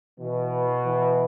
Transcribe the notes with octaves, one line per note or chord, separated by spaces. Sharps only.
B2 E3
E3